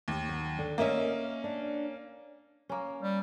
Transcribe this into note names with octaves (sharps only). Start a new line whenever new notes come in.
D#2
F#3
D3
A#3 C#4 A#4 D#5 E5
D4
A#3 C#4
G3